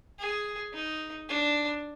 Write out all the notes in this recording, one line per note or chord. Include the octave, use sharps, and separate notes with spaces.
G#4
D#4
D4